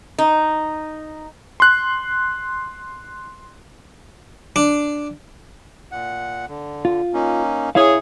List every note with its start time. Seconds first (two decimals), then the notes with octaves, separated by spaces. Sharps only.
0.18 D#4
1.60 C6 F#6
4.56 D4
5.92 A#2 F#5
6.48 D3
6.85 F4
7.14 A#3 C#4 D#4
7.75 C#3 E4 G#4 C#5 F5